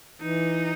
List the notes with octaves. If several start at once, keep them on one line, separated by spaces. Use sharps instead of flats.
E3 D#4